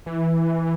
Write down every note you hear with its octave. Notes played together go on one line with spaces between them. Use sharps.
E3